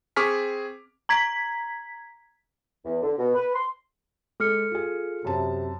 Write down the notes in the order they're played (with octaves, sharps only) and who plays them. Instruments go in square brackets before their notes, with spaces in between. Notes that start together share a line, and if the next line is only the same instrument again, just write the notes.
[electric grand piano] C4 G#4 C#6 D6 F6 B6
[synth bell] A#5 G#6 B6
[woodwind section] E2
D3
B2
B4
C6
[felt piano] G#3 [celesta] A4 F6 C#7
[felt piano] F4 G#4
[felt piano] F#2 A5 [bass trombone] C3